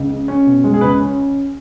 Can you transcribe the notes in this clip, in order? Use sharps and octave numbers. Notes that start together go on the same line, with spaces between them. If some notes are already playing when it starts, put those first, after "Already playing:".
Already playing: C#2
C#3
C#4
B2
G#3
G#4
C#2 B4
C#4